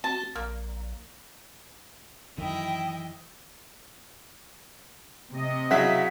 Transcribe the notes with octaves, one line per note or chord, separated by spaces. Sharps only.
C4 F#4 A5
A#1 A#3
F#2 D#3 E3 E4 D#5 G5
C3 D#5
C#3 F#3 E4 E5 F#5 B6